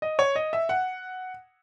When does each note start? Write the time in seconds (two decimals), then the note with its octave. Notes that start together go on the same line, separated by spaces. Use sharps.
0.02 D#5
0.19 C#5
0.36 D#5
0.53 E5
0.69 F#5